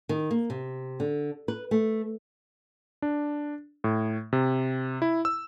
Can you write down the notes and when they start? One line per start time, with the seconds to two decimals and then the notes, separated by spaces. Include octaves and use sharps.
0.09 D#3
0.31 A#3
0.50 C3
1.00 D3
1.48 B4
1.71 A3
3.02 D4
3.84 A2
4.33 C3
5.02 E4
5.25 E6